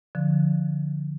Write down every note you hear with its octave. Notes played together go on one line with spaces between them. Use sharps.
D3 F3